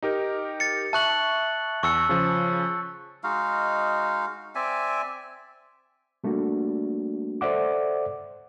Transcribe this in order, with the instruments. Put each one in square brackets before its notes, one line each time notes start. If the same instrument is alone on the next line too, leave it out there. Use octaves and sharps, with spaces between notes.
[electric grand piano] D#4 G4 A#4
[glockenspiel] A6 C#7
[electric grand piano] E5 C#6 [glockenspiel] A5 F#6 F#7
[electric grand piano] E2 [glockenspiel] C#6 E6 C#7
[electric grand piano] C#3 F3
[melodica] G#3 D#4 F#4 F5
C4 D5 E5 G#5
[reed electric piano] G3 A3 A#3 D4 F#4
A4 C5 D5 E5 F#5 D6